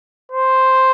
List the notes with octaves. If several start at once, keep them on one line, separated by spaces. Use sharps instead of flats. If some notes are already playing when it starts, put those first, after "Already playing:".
C5